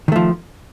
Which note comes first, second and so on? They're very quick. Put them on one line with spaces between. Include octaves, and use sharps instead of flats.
D#3 A3 F3